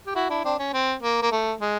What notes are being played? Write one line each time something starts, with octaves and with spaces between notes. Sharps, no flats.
G4
E4 F#4
D4 E4
C4 D4
C#4
C4
A#3
A#3
A3
G#3